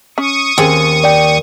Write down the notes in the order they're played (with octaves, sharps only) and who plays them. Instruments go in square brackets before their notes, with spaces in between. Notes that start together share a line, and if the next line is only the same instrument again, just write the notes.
[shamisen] C#4 [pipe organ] C#6 D#6
[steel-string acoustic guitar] D#2 [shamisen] C4 C#4 G#4
[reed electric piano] D5 G5